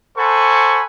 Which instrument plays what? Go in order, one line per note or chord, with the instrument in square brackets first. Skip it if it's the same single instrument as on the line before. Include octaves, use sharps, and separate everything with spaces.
[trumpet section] A4 C5 F#5 G#5 B5 C#6